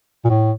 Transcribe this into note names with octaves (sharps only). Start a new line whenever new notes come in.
A#2
A2